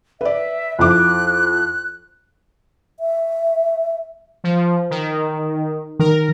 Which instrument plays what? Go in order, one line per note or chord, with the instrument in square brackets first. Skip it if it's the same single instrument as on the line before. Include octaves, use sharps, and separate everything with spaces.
[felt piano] B4 D5 [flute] E5
[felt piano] F2 E4 D6 [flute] F#6
[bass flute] E5
[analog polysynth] F3
D#3
[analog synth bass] D#3 [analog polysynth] A#4